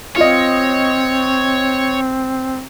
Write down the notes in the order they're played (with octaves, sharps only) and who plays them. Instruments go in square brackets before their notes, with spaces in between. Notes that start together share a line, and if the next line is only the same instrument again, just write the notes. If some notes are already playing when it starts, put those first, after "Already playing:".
[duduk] C4 [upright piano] F4 D#5 [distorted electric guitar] C#5